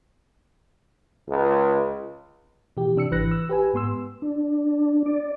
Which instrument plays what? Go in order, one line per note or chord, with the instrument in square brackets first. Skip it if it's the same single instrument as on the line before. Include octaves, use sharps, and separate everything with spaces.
[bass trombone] C#2
[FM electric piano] B2 E3 G4
C3 D4 E6 C#7
G#1 E3 B4 F#6 A#6
E6
G4 B4 G#5
G#2 B3 C6 E6
[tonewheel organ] D4
D5